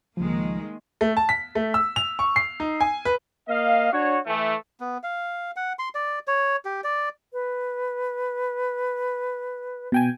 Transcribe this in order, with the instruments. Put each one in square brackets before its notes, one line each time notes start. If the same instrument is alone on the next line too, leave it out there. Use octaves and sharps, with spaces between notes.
[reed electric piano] C#2 F3 [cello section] D#3 G#3 A#3
[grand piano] A3
A5
B6
A3
E6
F7
C#6
C7
D#4
G#5
B4
[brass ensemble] A#3 D#5 F5
D4 F#4 C#5
E3 A3
[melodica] B3
F5
F#5
C6
D5
C#5
G4
D5
[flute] B4
[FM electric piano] B2 G5 G#5